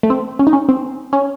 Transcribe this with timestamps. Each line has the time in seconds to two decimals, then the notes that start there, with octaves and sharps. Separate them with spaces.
0.03 A3
0.10 C4
0.39 C#4
0.47 D#4
0.53 C#4
0.69 C4
1.13 C#4